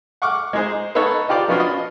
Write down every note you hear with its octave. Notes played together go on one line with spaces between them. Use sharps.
F#5 C#6 D6 F6
G#3 D#4 G#4 C5
B3 D#4 A4 C#5
D#4 F4 G4 C5 D5
F3 B3 C#4 D4 F4 F#4
D#5